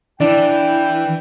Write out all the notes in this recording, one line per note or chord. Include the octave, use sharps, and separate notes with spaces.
E3 D4 E4 G5